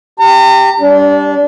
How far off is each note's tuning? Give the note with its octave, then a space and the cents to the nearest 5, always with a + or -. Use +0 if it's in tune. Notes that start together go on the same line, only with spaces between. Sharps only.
G4 -5 A#5 -40
G3 +0 D4 -25